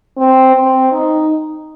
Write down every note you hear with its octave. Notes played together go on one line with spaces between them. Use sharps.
C4
C4
D#4